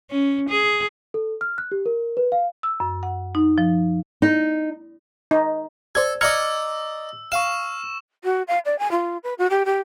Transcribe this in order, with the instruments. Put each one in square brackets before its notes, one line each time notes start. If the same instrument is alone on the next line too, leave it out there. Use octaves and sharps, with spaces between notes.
[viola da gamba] C#4
G#4
[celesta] A4
F6
F#6
G4
A#4
B4
F5
[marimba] E6
F#2
F#5
D#4
F3
[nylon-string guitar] D#4
[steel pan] D#4
[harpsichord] A4 [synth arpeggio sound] C5 D5 G#6
[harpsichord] D5 D#5 A#5 [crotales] E6 [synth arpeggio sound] F6 G#6 C#7
[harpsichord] F5 [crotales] C#6 E7
[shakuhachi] F#4
F5
D5
G#5
F4
B4
F#4
G4
G4